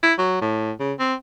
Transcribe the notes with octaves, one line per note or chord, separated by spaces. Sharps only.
E4
F#3
A2
C#3
C4